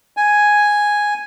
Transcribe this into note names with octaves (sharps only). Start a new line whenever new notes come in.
G#5